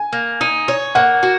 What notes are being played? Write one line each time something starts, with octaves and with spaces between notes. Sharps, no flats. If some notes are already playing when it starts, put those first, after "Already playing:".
Already playing: G#5
A#3
D#4
C#5
A#3 F#5
F#4